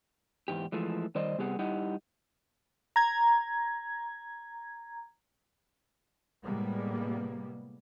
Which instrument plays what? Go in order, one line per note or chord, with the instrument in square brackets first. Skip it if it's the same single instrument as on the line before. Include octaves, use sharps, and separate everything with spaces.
[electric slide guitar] E2 G#2 G4
E3 F3 G#3 A3
D#3 G3 C5 D5 D#5
C3 G3 B3 G4 G#4 F#5
G3 D#4 E4 G4 D#5 F#5
[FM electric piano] A#5 G#6
[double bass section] A2 C3 G3 G#3 A#3 B3